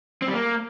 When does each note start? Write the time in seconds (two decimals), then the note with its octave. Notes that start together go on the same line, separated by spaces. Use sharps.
0.22 C4
0.28 G3
0.34 A#3